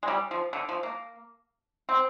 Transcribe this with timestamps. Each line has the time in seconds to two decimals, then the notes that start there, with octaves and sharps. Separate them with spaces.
0.03 G#3
0.08 G3
0.31 F3
0.53 D3
0.69 F3
0.83 A#3
1.89 C4